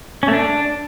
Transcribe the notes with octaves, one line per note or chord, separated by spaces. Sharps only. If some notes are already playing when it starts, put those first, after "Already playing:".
C#4
A3
D4